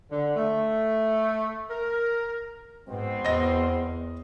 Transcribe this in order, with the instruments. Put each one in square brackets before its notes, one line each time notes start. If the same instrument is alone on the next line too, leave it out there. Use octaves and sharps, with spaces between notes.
[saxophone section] D3
A3
A#4
[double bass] G#2 [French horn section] B2 B3 C4
[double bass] E2 [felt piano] D#5 A#6